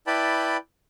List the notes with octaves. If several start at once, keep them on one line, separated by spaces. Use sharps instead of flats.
E4 B4 D5 G5 A5 B5